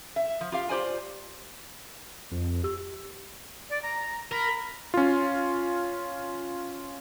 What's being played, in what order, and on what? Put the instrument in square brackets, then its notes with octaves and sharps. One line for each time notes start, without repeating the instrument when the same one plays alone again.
[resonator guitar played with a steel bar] E5
F3
F4 G4 F5
F4 G4 C5 D5 G#5
[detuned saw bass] F2
[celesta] G4 E6
[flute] D5
A#5
[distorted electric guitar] A#4 [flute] B5
[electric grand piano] C#4 F4